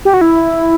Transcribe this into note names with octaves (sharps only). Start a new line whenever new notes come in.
G4
F#4
E4